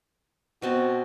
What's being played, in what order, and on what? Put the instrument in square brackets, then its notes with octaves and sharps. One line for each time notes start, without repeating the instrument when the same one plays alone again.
[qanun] B2 C4 A5 [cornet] F#4